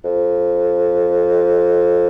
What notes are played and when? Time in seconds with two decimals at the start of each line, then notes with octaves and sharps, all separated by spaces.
0.04 F2